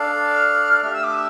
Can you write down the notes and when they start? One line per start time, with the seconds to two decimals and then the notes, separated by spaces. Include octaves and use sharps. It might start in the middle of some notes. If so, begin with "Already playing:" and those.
Already playing: D4 A4 D5 F5
0.33 F6
0.82 A3 D4 G4 F6
0.93 E6
1.03 D6
1.14 E6